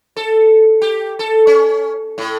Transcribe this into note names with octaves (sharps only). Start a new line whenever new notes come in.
A4
G4
A4
C#4
A2